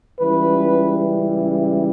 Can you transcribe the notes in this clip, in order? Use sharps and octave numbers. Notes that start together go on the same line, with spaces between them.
C#2 C#3 E3 G3 B4